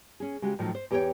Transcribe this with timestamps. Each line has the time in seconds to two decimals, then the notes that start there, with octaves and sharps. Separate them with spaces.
0.20 C#4 G#4
0.42 C#3 G#3 F#4 G4
0.59 A2 D#3 F3 F#3 A3
0.75 C5
0.91 E2 G4 G#4 C5 C#5 G5